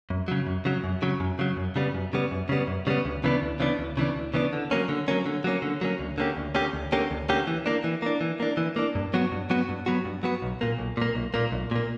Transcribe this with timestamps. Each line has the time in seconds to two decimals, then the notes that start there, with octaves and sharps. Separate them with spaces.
0.10 F#2
0.28 C#3 F#3
0.47 F#2
0.65 C#3 F#3
0.84 F#2
1.02 C#3 F#3
1.20 F#2
1.39 C#3 F#3
1.57 F#2
1.76 C#3 G3 B3
1.94 F#2
2.13 C#3 G3 B3
2.31 F#2
2.49 C#3 G3 B3
2.67 F#2
2.87 C#3 G3 B3
3.05 D2
3.24 C#3 E3 B3 D4
3.42 D2
3.60 C#3 E3 B3 D4
3.79 D2
3.97 C#3 E3 B3 D4
4.15 D2
4.34 C#3 E3 B3 D4
4.53 D3
4.71 F#3 A#3 C#4
4.89 D3
5.08 F#3 A#3 C#4
5.26 D3
5.44 F#3 A#3 C#4
5.62 D3
5.81 F#3 A#3 C#4
5.99 D2
6.18 D3 A#3 C#4 G4
6.37 D2
6.55 D3 A#3 C#4 G4
6.73 D2
6.92 D3 A#3 C#4 G4
7.11 D2
7.29 D3 A#3 C#4 G4
7.47 E3
7.66 A#3 D4
7.84 E3
8.02 A#3 D4
8.21 E3
8.40 A#3 D4
8.57 E3
8.76 A#3 D4
8.95 G2
9.14 F#3 B3 F#4
9.32 G2
9.50 F#3 B3 F#4
9.69 G2
9.86 F#3 B3 F#4
10.05 G2
10.23 F#3 B3 F#4
10.42 B1
10.61 A#2 A#3
10.78 B1
10.97 A#2 A#3
11.15 B1
11.34 A#2 A#3
11.52 B1
11.71 A#2 A#3